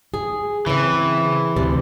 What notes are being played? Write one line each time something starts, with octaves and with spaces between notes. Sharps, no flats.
G#4
C#3 E3 C4
D2 C3 D5